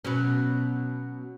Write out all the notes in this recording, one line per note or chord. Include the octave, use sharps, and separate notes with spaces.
B2 F#3 C#4